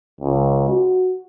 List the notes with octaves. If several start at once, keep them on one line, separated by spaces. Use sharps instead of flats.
C#2
F#4